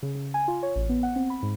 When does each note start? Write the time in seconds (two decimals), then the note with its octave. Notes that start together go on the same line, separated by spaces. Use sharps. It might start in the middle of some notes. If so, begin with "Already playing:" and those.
0.03 C#3
0.15 C#3
0.34 G#5
0.48 F4
0.63 C#5
0.76 A1
0.89 B3
1.03 F#5
1.16 C4
1.30 B5
1.43 G#2